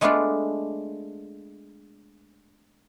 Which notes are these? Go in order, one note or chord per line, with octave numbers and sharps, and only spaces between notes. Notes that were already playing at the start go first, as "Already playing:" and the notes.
G#3 A3 B3 D4 F4 D5